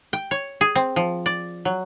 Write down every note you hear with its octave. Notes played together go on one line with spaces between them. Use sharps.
G5
C#5
G#4
C4
F3
D5
F#3